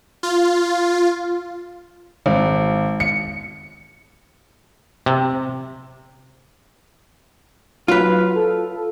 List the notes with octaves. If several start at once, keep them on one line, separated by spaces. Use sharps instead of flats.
F4
G#1
C#7
C3
F#3 F4 B4
A4